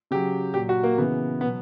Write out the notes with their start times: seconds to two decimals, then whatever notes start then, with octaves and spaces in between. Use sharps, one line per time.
0.11 C#3 F#3 G4
0.54 A#2 F#3 G4
0.69 F#4
0.83 A#3
0.98 C#3 E3 B3
1.40 B2 B3
1.43 F#3